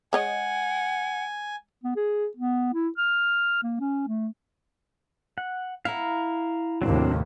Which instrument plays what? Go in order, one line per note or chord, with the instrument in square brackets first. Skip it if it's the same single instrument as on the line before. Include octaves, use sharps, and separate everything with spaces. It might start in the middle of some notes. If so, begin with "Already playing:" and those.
[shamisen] G#3 C#5 D#5 [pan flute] F#5 [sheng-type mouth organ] G#5
[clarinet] B3
G#4
B3
E4
F6
A#3
C#4
A3
[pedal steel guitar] F#5
[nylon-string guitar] E4 F#5 [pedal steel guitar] F5 A#5
[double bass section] D#2 A2 C3 [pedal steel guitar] F#3 C4 D4